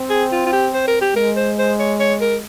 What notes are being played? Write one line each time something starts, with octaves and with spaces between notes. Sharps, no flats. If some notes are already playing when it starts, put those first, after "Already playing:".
Already playing: C4
G#4
F4
F4
G4
C5
A#4
G4
G#3 A#4
C5
C5
C#5
C#5
A#4